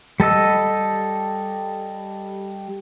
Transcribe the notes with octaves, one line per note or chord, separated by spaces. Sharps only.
G3 A4 D#5 E6